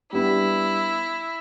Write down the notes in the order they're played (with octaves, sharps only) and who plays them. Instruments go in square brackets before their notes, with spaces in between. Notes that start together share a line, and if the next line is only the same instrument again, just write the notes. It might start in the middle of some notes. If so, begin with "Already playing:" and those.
[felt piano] G3 B3 D4 [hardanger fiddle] E4